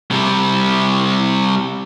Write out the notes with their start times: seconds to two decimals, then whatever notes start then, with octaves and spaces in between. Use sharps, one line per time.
0.11 C3 G3